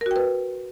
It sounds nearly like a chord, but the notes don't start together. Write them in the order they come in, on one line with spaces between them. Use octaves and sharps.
A#4 F#4 G5 B4